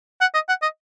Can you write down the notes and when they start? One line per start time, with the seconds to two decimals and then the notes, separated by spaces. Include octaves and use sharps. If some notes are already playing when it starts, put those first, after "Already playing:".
0.21 F#5
0.34 D#5
0.48 F#5
0.62 D#5